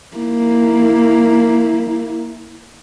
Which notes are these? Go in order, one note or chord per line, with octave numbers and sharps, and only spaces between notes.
A#3 E4